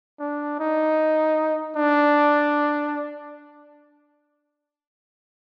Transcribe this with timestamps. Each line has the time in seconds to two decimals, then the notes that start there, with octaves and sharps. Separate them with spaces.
0.20 D4
0.59 D#4
1.76 D4